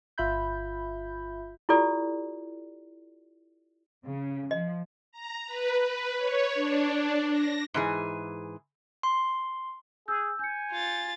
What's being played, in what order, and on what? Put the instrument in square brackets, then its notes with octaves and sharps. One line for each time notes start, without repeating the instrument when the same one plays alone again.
[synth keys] G1 F4 E5 B5 G6
[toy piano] E4 F4 G4 A4 D5
[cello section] C#3
[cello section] F3 [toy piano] D#5
[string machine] A#5
B4
B4
C#5
D4
D4
A#6
[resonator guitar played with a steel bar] G#2 E3 G#4
[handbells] C6
[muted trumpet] G#4 [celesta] E6 G6
[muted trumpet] G#5 [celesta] G6 C#7
[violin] F4 A6